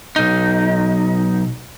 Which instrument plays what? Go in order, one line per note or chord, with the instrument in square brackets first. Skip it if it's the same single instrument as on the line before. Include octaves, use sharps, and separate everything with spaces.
[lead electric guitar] B1 D#4